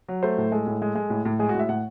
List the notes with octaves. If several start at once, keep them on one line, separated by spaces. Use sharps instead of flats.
F#3
A3 C5
A2
G#3 A4
A2
G#3
G#3
A2
A2
G#3 G#4
F#4
A2
E5
A2 F#5